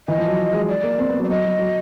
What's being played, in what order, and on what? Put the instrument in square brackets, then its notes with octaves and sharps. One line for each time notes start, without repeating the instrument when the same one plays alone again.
[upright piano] E3 [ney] D#5
[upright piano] F3
F#3
G#3
[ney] D5
[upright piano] A#3
C4
B3
F#3
[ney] D5
[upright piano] F#3 [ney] D#5
[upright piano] F#3
F#3